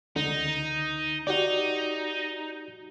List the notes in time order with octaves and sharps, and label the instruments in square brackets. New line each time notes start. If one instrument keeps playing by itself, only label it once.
[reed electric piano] C#2 D3 [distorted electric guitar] D#4
[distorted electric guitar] D#4 [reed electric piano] F#4 G4 D5